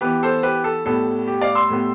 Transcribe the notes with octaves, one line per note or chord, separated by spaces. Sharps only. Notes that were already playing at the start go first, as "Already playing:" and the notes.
E3 B3 G4 B4
A4 C5
G4 B4
A4
A2 G3 B3 A4
G4
D5 F5
C6 E6
A2 G3 B3